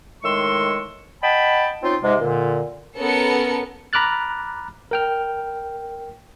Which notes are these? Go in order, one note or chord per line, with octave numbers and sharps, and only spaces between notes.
A2 D#3 G#3 C6 C#6 E6
D#5 F#5 G5 A5 B5
C4 C#4 D#4 F4
G#2 C3 G#3
A#2 D3
B3 C#4 A4 A#4 C#7
A#5 B5 D6 F6 F#6 A6
A#4 G5 F6